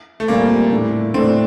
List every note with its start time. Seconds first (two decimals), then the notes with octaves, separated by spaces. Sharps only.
0.20 A3
0.28 A#2 G3 A#3 C4
0.71 A2 A3 D4
1.14 A2 A3 C4 D4